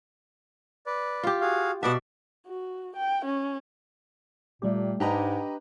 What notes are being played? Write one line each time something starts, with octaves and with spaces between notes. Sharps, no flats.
B4 D5
F4 G4
F#4 G#4 F5
B2 B3 D5 E5 F#5 A5
F#4
G5
C#4
A#2 G3 A3 G4
G#2 D4 G4 B4 D#5 A#5